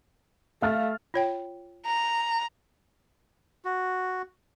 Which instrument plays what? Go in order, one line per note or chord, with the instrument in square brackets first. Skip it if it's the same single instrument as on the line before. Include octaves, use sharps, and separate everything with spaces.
[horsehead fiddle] A3 [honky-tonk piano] F5 F6 A6
[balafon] F4 C#5 G5
[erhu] A#5
[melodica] F#4